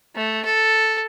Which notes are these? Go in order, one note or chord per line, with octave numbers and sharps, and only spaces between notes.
A3
A4